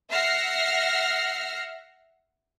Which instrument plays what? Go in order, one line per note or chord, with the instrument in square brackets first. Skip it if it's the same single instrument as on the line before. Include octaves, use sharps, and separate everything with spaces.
[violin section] E5 F#5 F6 A#6 C7